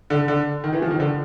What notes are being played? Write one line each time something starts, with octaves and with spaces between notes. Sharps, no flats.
D3
D3
D#3
E3
F3
D#3
D3